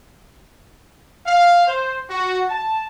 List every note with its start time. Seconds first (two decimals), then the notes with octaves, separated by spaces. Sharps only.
1.26 F5
1.67 C5
2.10 F#4
2.49 A5